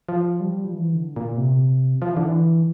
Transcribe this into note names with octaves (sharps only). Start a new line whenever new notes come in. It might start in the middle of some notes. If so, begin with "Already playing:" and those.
F3
G3
F3
E3
D3
A#2
C3
F3
E3
D3
E3